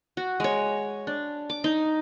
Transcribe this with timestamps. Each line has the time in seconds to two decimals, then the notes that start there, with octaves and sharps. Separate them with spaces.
0.17 F#4
0.40 G#3 C#5
1.07 D4
1.50 D6
1.64 D#4